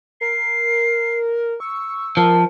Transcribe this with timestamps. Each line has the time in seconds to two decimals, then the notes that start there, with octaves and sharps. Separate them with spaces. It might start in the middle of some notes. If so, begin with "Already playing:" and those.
0.21 A#4 C7
1.60 C#6 E6
2.17 F3 A#4 A5